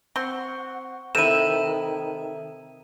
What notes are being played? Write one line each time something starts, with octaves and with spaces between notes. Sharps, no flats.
C4 F#5 C6 C#6
C3 D#3 E4 A4 E5 D#7 E7